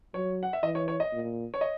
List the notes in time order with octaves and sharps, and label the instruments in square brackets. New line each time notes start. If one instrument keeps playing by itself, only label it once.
[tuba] F#3 [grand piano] C#5
[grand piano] F#5
E5
[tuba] E3 [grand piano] D#5
[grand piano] C#5
C#5
D#5
[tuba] A#2
[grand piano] C#5
D#5